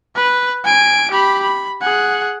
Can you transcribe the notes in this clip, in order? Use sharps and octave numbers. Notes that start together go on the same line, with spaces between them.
B4
G#5 D7
G4 B5
B5
G#4 F#5